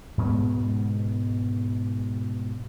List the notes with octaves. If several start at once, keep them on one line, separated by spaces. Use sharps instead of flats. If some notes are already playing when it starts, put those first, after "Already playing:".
G#2 B2 G#3 B3